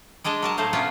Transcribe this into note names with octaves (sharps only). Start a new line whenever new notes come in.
G3 G#3 D4 D#5 A5
F#3 A#4 A5
A2 F#3 A3 C5 F5
C3 B3 C#4 F4